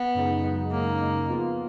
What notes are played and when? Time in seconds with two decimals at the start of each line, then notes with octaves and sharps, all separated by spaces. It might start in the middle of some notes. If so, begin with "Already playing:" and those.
Already playing: B3
0.14 F#2 C#3 G#3 D#4
0.43 F#2 C#3 G#3 D#4
0.71 F#2 C#3 G#3 A#3 D#4
1.01 F#2 C#3 G#3 D#4
1.29 F3 B3 F4